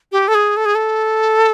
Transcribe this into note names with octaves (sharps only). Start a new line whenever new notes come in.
G4
A4
G#4
A4
G#4
A4